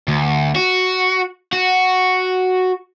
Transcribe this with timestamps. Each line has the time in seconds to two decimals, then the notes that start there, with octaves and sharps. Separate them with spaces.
0.08 D2
0.56 F#4
1.53 F#4